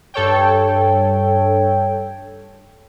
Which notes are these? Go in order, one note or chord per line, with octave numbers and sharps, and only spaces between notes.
G2 A4 C#5 G5